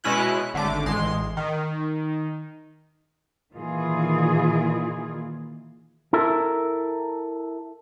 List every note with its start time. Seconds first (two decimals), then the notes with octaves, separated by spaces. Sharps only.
0.04 B2 G#3 C#4 E4 F#6
0.54 G#1 D3 A3 D6
0.86 A1 G#3 C6
1.37 D#3
3.54 A#2 D#3 E3 F4 G#4
6.13 E4 A4 A#4 E5